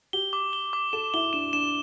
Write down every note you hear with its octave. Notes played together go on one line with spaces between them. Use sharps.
G4 G7
D6
G7
D6
A4 E7
E4 G7
D4 E7
D4 E7